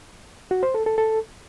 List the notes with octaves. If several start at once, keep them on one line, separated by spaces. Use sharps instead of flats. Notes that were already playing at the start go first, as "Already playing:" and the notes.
F#4
C5
A4
A4
A4